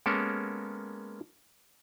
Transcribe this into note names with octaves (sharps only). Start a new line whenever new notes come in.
G#3 A#3 B3 C#4 A4 A#4